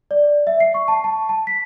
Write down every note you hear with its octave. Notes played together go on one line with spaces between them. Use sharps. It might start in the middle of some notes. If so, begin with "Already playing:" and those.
D5
E5
C7
C#6
A5
A5
A5
B6